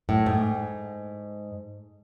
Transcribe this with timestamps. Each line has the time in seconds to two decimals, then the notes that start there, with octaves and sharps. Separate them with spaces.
0.09 A2
0.26 G#2